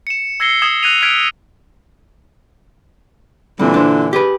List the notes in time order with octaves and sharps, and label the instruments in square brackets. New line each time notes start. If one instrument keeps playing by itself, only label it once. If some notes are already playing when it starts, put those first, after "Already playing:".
[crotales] C#7 E7
E6 G#6 A#6 C7 C#7 G7
D#6 G#6 E7 G7
F#6 G#6 A#6 D#7 F7
F6 F#6 G#6 B6 D7 F7
[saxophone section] A#2 D3 E3 [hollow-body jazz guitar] G3 C4
[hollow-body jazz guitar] D4 C5
G4 G#4 B4